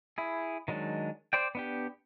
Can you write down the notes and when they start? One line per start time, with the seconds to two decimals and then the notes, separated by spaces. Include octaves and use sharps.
0.18 E4 G#4
0.68 D#3 F#3 G#3 D4
1.33 C5 D5 G5
1.55 B3 D4 G4